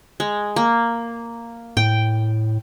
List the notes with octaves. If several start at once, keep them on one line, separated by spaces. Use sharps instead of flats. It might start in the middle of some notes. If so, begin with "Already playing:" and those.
G#3
A#3
A2 G5